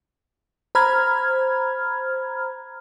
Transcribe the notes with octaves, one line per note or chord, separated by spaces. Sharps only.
C5 A#5 B5 F6 G#6